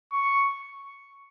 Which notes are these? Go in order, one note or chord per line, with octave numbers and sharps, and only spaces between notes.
C#6